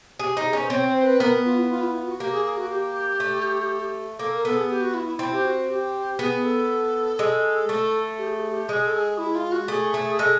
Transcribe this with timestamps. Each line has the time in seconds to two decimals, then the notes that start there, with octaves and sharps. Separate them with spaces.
0.20 G4 G#4
0.37 D#4
0.45 G#4
0.53 C#4
0.61 C5
0.70 C4 C#5
0.87 C5
1.03 B4
1.20 B3 A#4
1.45 F4
1.57 E4
1.70 F4
1.82 E4
1.95 F4
2.07 F#4
2.20 A#3 G4
2.31 G#4
2.45 G#4
2.57 F#4
2.70 G4
3.20 A3
4.19 A#3 A4
4.32 A#4
4.44 B3 A4
4.57 G#4
4.69 G4
4.81 F#4
4.94 E4
5.07 E4
5.19 C4 E4
5.33 G4
5.44 F#4
5.69 G4
6.19 B3 G#4
6.44 A4
7.19 G#3
7.69 A3 A4
8.18 G4
8.26 G#4
8.33 G4
8.41 G#4
8.49 G4
8.69 G#3 G#4
8.87 A4
8.94 G#4
9.18 E4
9.35 F4
9.52 F#4
9.68 A3 G#4
9.94 A3
10.19 G#3 A4